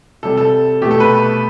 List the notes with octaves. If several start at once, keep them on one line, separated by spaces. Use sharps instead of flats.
C3 G3 A4
A4
B2 A3 G4
A4
B4